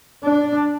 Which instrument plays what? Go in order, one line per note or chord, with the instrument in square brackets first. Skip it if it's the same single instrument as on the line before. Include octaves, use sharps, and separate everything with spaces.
[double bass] D4